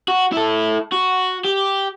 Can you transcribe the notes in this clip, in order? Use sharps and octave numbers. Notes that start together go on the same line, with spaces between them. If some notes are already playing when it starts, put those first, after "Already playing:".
F#4
E4 A4
F#4
G4